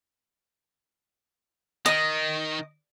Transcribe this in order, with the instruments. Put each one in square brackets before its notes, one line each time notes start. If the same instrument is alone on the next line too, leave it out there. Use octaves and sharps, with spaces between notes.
[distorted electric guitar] D#3 [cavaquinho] D#5